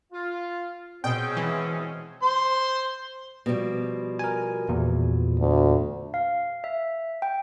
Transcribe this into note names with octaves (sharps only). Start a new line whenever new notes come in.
F4
B2 G#3 C4 C#4 G5
E3
C5 C6
B2 F3 G3
A#4 G#5
E2 A#2
D2
F5
E5
G5